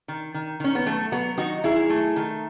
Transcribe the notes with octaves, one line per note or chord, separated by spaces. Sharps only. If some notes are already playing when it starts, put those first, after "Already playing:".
D#3
D#3
D#3 C#4
B3
F#3 A3
F#3 B3
D#3 D#4 F#4
F#3 E4 G#4
A3
D#3